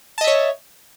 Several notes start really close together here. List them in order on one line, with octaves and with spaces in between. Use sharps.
A5 D#5 E5 C#5